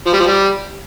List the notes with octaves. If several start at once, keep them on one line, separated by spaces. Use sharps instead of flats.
F3
G3
F3
G3